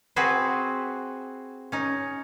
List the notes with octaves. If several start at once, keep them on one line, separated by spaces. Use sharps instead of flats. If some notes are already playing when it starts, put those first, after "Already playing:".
C4 F#4 G#4 B4 C5
C#4 D#4